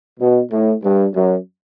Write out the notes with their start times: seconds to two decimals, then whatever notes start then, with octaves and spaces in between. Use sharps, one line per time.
0.20 B2
0.51 A2
0.84 G2
1.15 F#2